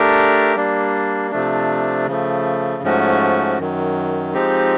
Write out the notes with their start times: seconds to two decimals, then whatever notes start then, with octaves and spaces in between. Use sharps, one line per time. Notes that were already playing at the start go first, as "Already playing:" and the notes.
Already playing: A3 D4 G4 A#4
0.56 G3 A#3 D4
1.31 C3 F3 A3 D4
2.07 C#3 F3 A3
2.83 G#2 F3 A3 C#4 F#4
3.58 F#2 D#3 F#3
4.33 F3 G#3 C4 D#4 G4